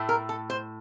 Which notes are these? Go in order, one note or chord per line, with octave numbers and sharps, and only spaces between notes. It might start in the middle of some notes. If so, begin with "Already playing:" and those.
Already playing: A2 A3
A#4
A4
C5